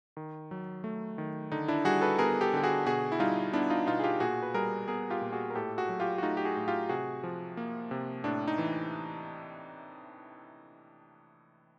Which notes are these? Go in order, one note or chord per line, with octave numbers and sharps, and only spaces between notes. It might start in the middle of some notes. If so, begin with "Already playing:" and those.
D#3
F#3
A3
D#3
D3 D#4
D4 E4
G3 F#4 G#4
A4 B4
B3 G#4 A#4
G4 A4
D3 G4
F#4 G#4
B2 F#4 G#4
E4
G3 D#4 F4
B3 D4 E4
D#4 F4
B2 D#4 F4
G#4
F4 G4
A#2 F#4 G#4
B4
G3 G#4 A#4
B3 G#4 A#4
F4 G4
A#2
F#4 G#4
A#4
A2 G4 A4
F#4 G#4
F#3
F4 G4
F#4
A3 D#4 F4
G4
F#4 G#4
A2
F4 G4
C3 F#4 G#4
F3
A#3
C3
A2 D4
D#4
E3